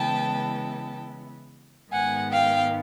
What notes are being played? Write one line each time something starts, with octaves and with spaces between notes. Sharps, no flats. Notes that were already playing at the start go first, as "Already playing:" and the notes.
Already playing: C#3 E3 G#3 B3 E4 G5 A5
G#2 D#3 G#3 B3 F#5 G#5
F5 G5